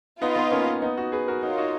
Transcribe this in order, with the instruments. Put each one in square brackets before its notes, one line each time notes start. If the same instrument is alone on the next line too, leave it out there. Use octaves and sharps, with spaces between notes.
[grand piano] B3 D#4 [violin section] F4 B4 D#5
[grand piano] B3 D#4
A#3 C#4
B3 D#4
D#4 F#4
G#4 B4
F#4 A#4
[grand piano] D#4 F#4 [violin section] F4 A#4 C#5
[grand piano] D#4 F#4